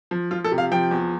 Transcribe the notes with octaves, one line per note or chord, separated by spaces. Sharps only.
F3
F3 F4
A4
C3
F5
F3 G5
E2